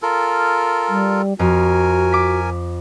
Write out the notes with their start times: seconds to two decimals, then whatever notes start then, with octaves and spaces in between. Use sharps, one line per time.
0.02 F4 A4 A#4
0.89 G3
1.39 F2 F#4 A#4 G#5
2.12 D6 B6